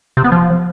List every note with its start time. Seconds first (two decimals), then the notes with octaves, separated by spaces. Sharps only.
0.17 C3
0.24 B3
0.32 F3